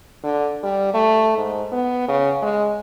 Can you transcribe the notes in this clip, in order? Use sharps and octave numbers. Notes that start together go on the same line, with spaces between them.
D3
G3
A3
G#2
B3
C#3
G#3